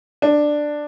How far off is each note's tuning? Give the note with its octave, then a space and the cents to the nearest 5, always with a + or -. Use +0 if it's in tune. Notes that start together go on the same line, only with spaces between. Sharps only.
D4 +10